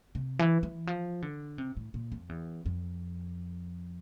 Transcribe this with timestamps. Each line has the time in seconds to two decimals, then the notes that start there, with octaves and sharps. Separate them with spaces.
0.15 C3
0.39 E3
0.63 E3
0.87 F3
1.22 D3
1.58 C3
1.77 A2
1.94 A#2
2.12 F2
2.29 E2
2.66 F2